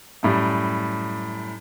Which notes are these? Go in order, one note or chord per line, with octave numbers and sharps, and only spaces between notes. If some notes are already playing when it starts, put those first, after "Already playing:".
F#2 A2 G3